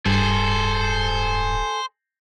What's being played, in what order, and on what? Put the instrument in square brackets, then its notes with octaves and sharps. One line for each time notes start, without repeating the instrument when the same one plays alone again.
[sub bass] D1 [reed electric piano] G2 [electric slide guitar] G#4 A4 [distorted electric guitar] C5